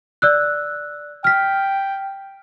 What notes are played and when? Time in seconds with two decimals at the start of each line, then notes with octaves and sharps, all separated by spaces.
0.22 D5 E6 F#6
1.24 G5 F6 B6